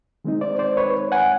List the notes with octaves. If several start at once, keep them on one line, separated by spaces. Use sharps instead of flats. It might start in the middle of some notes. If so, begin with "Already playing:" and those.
D#3 G#3 C4 D#4
C5 D5
C5 D5
B4 C#5
F#5 G#5